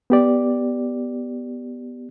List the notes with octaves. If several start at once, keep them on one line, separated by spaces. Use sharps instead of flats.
B3 G4 D5